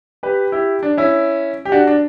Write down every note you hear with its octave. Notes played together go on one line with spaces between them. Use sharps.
G4 B4
E4 G4
D4
C#4 E4
G4
D4 F#4
D4